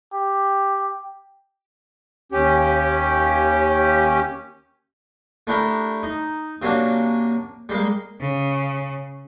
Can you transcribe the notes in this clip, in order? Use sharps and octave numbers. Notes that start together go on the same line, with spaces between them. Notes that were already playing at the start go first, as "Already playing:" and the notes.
G4
D#2 C#4 G4
A3 D4 E4 G4 A#4
D#4
C3 F#3 A#3 C#4 D4
G3 G#3 A#3
C#3